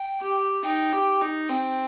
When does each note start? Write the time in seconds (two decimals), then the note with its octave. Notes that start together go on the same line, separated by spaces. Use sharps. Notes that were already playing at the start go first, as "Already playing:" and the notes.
Already playing: G5
0.21 G4
0.64 D#4 G5
0.93 G4
1.22 D#4
1.49 C4 G5